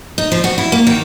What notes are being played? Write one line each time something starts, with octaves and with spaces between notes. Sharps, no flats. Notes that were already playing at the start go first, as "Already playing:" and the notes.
D#4
F3
F#4
E4
A#3
D#3